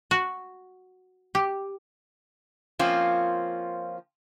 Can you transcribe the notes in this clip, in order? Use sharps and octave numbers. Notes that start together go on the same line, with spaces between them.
F#4
G4
F3 A#3 C4 C#4 F4